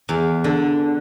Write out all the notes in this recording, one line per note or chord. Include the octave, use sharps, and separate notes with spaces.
E2
D3